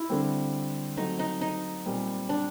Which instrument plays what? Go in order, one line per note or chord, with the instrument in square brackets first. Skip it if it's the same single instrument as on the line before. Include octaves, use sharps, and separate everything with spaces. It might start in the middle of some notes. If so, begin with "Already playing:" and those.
Already playing: [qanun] E4
[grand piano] D3 G3 C4
[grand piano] F#3 A3 C4 [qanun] D#4
[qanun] D#4
D#4
[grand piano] A#2 G3 C4
[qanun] D4